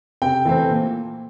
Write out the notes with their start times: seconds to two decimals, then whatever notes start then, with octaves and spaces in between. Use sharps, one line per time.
0.22 C3 G5
0.45 E3 A3 C4
0.70 A#2